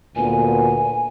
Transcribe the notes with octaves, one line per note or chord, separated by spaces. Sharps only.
D2 A#2 B3 G#5